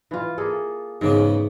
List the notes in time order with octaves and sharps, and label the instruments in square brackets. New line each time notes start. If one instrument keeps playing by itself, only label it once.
[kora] E3 F4
A#3 G#4 A4
[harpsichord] E2 C#3 B3 [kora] G#2